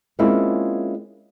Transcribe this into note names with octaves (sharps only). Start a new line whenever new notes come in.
G#3 A#3 C4 C#4 E4 F4